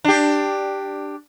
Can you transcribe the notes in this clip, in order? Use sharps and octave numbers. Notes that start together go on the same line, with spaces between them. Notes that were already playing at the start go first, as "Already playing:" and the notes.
D4 G4